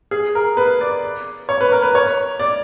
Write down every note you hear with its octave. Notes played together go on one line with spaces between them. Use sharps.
G#4
A#4
B4
D5
C#5
B4
A#4
B4
C#5
D5